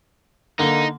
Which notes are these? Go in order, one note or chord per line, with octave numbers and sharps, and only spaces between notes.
D3 A#3 D#4